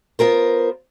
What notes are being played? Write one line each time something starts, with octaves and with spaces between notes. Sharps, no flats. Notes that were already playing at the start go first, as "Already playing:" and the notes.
B3 F4 A#4 C5